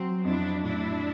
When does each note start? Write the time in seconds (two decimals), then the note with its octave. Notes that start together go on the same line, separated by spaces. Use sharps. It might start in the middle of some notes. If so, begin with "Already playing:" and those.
Already playing: F#3 C4
0.24 F2 D4 E4
0.63 A2 D4 E4